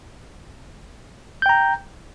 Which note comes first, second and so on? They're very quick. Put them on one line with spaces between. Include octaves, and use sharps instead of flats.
G6 G5 A#5